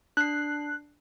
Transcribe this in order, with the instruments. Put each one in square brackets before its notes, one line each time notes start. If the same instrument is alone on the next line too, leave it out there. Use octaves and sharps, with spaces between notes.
[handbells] D4 C7 [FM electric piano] F#6